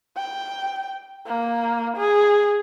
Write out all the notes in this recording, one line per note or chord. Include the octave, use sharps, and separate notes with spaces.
G5
A#3
G#4